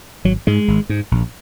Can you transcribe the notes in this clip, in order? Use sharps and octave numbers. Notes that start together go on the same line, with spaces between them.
G#1 F#3
G#2 G#3
G#1
G#2
A#1